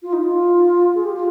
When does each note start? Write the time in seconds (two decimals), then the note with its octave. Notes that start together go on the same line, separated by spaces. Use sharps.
0.03 F4
0.13 D#4
0.23 F4
0.95 G#4
1.04 G4
1.15 F4